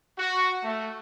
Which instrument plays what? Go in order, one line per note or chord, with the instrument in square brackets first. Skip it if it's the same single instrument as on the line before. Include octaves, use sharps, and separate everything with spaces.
[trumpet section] F#4
A3